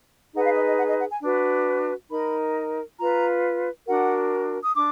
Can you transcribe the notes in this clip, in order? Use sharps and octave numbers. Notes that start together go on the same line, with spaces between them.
D#4 G#4 B4 F#5
F5
D#5
D#5
F#5
D#5
F#5
G#5
D4 F#4 B4
D#4 A#4 B5
F4 B4 A#5
D4 F#4 A#4 F#5
D#6
D4 D6